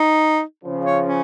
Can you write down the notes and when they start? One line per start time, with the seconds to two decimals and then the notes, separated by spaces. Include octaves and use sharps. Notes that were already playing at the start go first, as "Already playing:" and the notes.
Already playing: D#4
0.64 C#3 F3
0.85 C#5
1.05 C#4